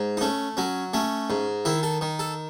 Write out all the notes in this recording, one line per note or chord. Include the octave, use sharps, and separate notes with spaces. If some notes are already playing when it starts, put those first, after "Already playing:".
Already playing: G#2
D#4
A3 C#4
F#3 C#4
A3 C#4
G#2
D#3 E4
A4
D#3
A4